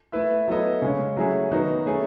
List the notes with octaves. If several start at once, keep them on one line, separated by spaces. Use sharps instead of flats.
A3 E4 B4 E5
F#3 B3 E4 A4 D#5
C#3 G#3 C#4
F#3 A3 C#4 E4 G#4
D#3 F#3 B3 D#4 F#4
A3 C#4 G#4